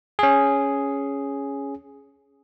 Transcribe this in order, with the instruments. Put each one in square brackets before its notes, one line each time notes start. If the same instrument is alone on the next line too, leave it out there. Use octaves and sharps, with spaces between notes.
[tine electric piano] C#4 G#4